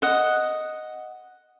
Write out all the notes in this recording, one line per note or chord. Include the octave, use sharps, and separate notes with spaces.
D#5 F#5